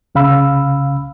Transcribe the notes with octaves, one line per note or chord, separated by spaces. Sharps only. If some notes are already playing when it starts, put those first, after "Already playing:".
C2 C#3 F5 B5 E6